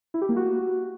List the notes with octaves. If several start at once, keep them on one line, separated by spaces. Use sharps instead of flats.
E4
G4
A#3
F#4